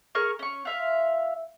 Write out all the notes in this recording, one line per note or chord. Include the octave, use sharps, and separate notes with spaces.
G#4 A#4 C#6 F6
C#4 C#6
F4 E5 F5